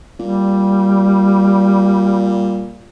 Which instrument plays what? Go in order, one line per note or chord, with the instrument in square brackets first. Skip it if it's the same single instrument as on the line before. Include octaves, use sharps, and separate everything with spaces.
[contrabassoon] A#2 [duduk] G3